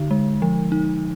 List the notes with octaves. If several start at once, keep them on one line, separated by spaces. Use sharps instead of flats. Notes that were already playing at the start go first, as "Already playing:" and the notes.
Already playing: D3 D#4
G#3
F3
D#4